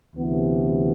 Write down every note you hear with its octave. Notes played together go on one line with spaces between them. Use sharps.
D2 C3 E3 B3